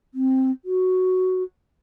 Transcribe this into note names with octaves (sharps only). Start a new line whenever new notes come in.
C4
F#4